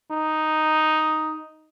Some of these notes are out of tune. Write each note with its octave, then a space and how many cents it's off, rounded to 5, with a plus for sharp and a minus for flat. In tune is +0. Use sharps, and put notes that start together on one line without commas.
D#4 +0